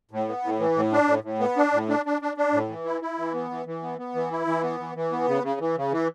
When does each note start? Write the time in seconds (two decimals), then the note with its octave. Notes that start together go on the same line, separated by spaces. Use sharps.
0.11 A2
0.28 B3
0.44 A2
0.59 E3
0.76 A2
0.93 D4
1.08 A2
1.24 A2
1.40 B3
1.57 D4
1.73 A2
1.89 D4
2.06 D4
2.22 D4
2.37 D4
2.53 A2
2.69 E3
2.85 E4
3.02 E4
3.18 E3
3.34 B3
3.51 E3
3.66 E3
3.83 B3
3.98 B3
4.15 E3
4.31 E4
4.47 E3
4.63 B3
4.80 E3
4.96 E3
5.12 B3
5.28 C#3
5.43 C#3
5.60 E3
5.77 C#3
5.92 E3